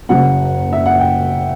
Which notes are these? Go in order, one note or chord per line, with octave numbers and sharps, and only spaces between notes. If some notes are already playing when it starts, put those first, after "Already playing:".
F#1 F#2 C#3 F#5
E5
F#5
G5